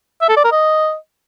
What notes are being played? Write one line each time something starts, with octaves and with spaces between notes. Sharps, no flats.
E5
A4
D5
A#4
D#5